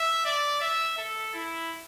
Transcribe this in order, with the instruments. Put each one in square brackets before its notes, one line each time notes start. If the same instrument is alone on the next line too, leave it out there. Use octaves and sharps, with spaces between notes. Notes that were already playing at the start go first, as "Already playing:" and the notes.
Already playing: [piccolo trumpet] E5
D5
E5
A4
E4